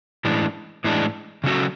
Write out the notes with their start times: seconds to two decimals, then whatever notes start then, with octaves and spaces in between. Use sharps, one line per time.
0.25 A2 E3 G#3 D4
0.84 A2 E3 G#3 D4
1.44 C#3 F#3 C#4 F#4 A4